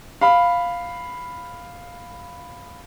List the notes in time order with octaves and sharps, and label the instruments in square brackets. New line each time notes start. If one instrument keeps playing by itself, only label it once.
[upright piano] F5 B5